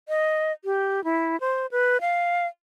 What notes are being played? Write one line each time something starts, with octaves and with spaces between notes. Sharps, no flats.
D#5
G4
E4
C5
B4
F5